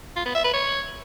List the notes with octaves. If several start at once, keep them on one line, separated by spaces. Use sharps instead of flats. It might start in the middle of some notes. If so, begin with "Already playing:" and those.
F4
B3
E5
B4
C#5